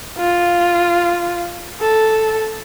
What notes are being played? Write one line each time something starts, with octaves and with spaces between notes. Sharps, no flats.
F4
A4